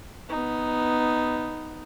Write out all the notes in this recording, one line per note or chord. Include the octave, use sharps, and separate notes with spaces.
B3 D#4